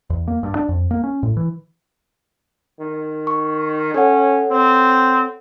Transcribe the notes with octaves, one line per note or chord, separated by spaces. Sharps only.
E2
A#3
G2
D4
F2
A#3
C#4
A2
E3
D#3
C#6
C#4 A4 C#5 F#5
C4